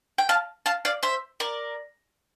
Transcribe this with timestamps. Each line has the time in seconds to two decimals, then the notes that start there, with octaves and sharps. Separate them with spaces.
0.18 G5
0.29 F5 A5
0.66 F5 A5
0.85 D5 F5
1.03 C5 E5
1.40 A#4 D5